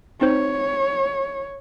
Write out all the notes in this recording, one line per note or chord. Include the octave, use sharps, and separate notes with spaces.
C4 D#4 C5 C#5